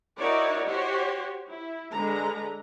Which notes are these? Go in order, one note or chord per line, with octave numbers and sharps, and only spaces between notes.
D#4 E4 F#4 A#4 C#5 D5
F#4 G4 C5 C#5
E4
D3 G#3 B4 A#5